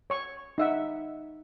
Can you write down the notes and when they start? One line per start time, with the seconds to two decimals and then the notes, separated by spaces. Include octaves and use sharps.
0.10 C#5 C#6
0.58 D#4 E5 F#5